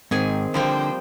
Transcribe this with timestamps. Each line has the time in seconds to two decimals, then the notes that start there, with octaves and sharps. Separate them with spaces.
0.11 G#2 D#3 C4 G#4 G#5
0.54 D3 F3 G3 A#3 C5 G5